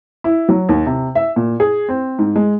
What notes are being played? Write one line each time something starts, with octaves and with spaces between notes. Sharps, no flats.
E4
F#3
D#2
C3
E5
A#2
G#4
C4
G#2
G#3